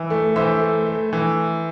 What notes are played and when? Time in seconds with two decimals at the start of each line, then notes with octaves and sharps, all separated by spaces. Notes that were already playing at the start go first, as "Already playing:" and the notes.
Already playing: E3
0.10 A3
0.36 E3 C5 E5
0.62 A3
0.87 A3
1.13 E3